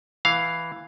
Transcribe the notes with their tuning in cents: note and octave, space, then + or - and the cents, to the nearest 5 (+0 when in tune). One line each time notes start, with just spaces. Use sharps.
E3 +0 F5 +0